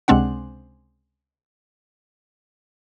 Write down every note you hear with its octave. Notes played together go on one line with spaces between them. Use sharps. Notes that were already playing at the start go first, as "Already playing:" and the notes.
C#2 C3 G#3 C4 D4 F#5